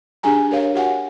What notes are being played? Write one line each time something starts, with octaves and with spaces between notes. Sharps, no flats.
D4 G4 G#4 G#5 A#5
G4 A#4 C#5 F5
F#4 G4 F#5 G#5